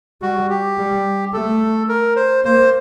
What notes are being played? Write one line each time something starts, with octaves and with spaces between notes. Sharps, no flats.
G3 F#4
G4
G3
A3 A4
A#4
C5
A#3 C5